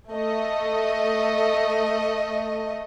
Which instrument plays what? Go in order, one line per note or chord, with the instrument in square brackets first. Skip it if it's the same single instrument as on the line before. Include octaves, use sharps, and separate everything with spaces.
[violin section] A3 D#5